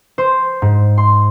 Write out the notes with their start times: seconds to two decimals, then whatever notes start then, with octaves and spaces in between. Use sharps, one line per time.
0.18 C5
0.62 G#2
0.98 C6